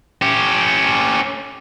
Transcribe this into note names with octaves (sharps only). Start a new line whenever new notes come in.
C#4 G4